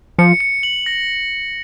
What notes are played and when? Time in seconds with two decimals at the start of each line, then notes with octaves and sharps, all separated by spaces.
0.18 F3 C#7
0.40 C#7
0.63 F#7
0.86 A#6